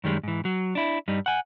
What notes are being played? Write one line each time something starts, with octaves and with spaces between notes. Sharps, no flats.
F#2 D#3 G3 G#3
G#2 E3
F#3
D4 E4
G2 G3 D#4
F#5 G#5